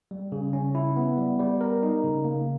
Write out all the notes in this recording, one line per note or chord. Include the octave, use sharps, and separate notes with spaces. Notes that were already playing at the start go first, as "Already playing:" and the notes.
G3
C#3
C#4
E4
B3
G3
G3
A#4
D#4
C#3
A#3